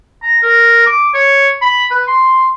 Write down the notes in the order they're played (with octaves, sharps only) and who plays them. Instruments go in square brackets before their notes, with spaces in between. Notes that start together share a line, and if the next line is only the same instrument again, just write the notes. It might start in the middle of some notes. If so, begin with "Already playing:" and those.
[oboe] A#5
A#4
D6
C#5
B5
B4
C6